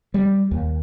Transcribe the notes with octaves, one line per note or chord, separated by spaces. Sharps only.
G3
D#2